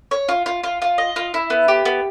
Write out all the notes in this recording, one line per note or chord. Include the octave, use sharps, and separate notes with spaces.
C#5
F4
F4
F4
F4
D#5
F4
E4
B3
G4
B3